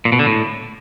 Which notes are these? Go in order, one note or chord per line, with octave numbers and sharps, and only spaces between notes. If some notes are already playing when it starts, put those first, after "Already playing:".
A#2
B2
D3
A2